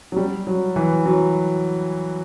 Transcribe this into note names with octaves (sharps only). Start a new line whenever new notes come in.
F#3
G3
F#3
E3
F#3